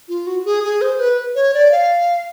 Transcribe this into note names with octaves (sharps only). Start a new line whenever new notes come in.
F4
F#4
G#4
G#4
C5
B4
C#5
D5
F5